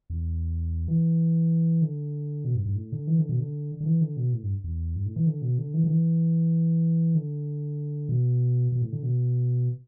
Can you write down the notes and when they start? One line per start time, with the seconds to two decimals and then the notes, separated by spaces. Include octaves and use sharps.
0.10 E2
0.88 E3
1.82 D3
2.45 B2
2.55 G2
2.66 G2
2.76 A2
2.92 D3
3.07 E3
3.19 D3
3.29 B2
3.40 D3
3.80 D3
3.86 E3
4.01 D3
4.17 B2
4.33 A2
4.43 G2
4.64 E2
4.96 G2
5.06 A2
5.16 E3
5.27 D3
5.42 B2
5.58 D3
5.74 E3
5.84 D3
5.90 E3
7.15 D3
8.09 B2
8.72 B2
8.82 A2
8.93 D3
9.03 B2